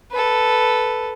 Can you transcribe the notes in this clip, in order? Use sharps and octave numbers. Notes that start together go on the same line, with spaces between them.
A4 B4